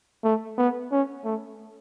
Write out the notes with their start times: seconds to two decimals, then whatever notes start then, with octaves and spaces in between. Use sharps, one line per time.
0.24 A3
0.58 B3
0.91 C#4
1.25 A3